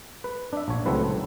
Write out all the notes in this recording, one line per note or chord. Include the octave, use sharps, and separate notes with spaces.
B4
D4 E5
A#1 C#5
C#2 F#3 A3 C4 E4 B4